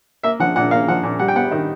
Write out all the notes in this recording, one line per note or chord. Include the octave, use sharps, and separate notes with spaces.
A#3 E5
F3 F#5
A#2 F#5
A#3 F5
F3 F#5
A#2
G3 F#5
G5
B3 F#5
D#3